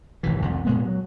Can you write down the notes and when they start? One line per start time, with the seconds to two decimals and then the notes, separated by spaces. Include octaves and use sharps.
0.23 G#1 C3 E3
0.42 C2 F2
0.65 A#2 G#3 B3
0.85 F#3